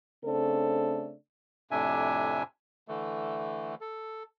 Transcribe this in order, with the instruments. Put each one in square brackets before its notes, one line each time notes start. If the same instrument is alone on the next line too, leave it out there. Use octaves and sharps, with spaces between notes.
[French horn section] C#3 A3 C4 D4 A4
[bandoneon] F2 A2 C3 D4 E5 G#5
D3 E3 A3
A4